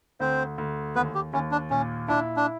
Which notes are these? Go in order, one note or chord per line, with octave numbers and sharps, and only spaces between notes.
D2 C4 C5
D2
D#2 B3 B4
G4
D#2 C#4
D4
A#2 C#4
D4 E4
D4